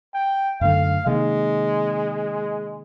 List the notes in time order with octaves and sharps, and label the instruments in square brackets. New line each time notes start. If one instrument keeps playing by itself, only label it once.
[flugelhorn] G5
[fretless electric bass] F#2 D3 A3 [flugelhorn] F5
[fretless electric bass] C3 D#3 A#3 [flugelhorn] G#3